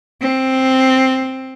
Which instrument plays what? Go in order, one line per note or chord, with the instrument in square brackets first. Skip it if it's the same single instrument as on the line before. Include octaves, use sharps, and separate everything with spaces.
[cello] C4